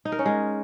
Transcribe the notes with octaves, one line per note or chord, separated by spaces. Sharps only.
D#4
A#4
C#4
G#3